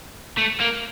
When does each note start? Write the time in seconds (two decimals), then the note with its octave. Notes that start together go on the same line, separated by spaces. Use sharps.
0.38 A3
0.60 A#3